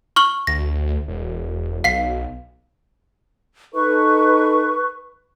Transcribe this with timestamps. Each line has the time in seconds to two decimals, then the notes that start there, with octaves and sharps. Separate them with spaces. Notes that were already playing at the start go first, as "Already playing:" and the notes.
0.16 C#6 F6 F#7
0.47 D2 A#6
1.08 E1
1.84 B1 F5 B6 C7
3.74 D#4 A4 B4 C#6